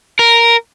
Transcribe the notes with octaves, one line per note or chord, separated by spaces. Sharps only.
A#4